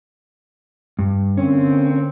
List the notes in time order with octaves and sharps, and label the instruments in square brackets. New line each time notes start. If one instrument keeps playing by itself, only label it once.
[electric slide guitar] G2
[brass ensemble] D3 A#3 C4 [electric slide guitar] C#4